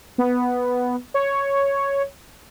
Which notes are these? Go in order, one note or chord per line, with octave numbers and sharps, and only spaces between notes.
B3
C#5